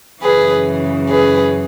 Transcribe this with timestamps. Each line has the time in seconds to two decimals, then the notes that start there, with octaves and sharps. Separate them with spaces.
0.23 F#2 C#3 E3 G#4 B4
1.09 G#4 B4